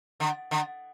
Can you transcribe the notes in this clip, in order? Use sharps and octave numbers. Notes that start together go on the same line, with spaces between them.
D3
D3